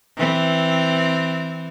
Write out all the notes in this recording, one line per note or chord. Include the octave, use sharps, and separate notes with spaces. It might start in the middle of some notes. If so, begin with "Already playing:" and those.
E3 C4